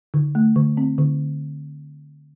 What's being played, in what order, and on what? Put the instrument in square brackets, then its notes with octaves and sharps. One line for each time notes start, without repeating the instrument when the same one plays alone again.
[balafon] D3
A3
D3
C4
D3